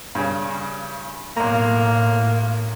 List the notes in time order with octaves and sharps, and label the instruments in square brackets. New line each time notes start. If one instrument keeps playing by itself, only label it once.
[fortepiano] G2 C#3
[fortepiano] B1 A#5 [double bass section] A2 [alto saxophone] A#3